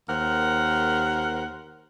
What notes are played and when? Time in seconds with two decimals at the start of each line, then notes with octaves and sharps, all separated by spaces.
0.09 D#2 A#4 C5 F#5